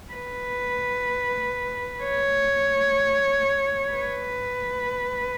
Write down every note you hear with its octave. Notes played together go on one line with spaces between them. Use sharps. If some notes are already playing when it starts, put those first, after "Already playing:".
B4
C#5
B4